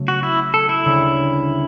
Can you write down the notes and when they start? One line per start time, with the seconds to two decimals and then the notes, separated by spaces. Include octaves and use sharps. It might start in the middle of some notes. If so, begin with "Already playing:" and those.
Already playing: C#3 F#3 A3
0.08 F#4
0.23 E4
0.54 A4
0.69 E4
0.85 D2 C#3 G3